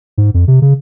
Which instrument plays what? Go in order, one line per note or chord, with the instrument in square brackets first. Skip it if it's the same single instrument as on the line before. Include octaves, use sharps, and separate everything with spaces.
[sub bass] G#2
F2
C3
C#3